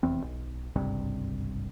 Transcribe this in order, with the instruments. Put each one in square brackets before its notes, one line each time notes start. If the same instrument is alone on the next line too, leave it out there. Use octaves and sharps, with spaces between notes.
[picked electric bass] F1 E2 C4
B1
G#1 C#2 G2 C3